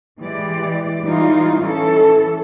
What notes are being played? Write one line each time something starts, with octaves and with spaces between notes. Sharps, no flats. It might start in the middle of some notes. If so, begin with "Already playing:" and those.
E3 G#3 G4 D5
E3 G3 D#4 F4
E3 C#4 A4